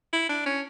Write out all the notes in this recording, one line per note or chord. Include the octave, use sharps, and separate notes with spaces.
E4
D4
C#4